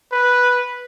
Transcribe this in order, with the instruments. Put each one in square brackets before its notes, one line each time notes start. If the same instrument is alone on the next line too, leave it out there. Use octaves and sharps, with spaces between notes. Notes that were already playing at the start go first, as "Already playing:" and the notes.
[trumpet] B4